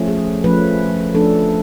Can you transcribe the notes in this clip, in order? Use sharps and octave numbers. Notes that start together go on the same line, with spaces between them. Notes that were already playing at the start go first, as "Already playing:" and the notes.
Already playing: F3 A3 C#4
G#4
F3 A3 C#4 B4
F3 A3 D4 A4